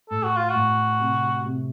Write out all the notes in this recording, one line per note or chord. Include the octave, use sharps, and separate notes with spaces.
A2 A4
F#4
F4
F#4
A2
C3
C3